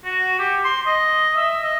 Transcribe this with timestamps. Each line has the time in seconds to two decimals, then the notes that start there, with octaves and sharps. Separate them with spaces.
0.04 F#4
0.39 G4
0.64 C6
0.86 D#5
1.37 E5
1.62 D#5